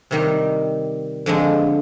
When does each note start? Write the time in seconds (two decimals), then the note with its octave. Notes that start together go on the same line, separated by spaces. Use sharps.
0.11 C3 D#3 G3
1.26 F2 D3 F3 G#3